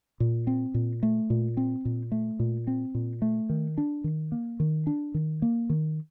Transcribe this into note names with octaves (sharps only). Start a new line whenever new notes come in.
A#2
C4
A#2
A3
A#2
C4
A#2
A3
A#2
C4
A#2
A3
D#3
D4
D#3
A#3
D#3
D4
D#3
A#3
D#3